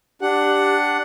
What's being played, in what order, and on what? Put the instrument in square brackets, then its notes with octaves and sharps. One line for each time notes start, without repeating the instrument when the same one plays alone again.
[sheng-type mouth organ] D4 F#5 [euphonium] G4